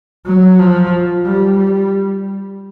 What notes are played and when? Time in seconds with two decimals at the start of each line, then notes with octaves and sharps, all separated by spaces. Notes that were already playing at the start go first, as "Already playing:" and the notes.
0.26 F#3
0.59 F3
1.25 G3
1.58 G3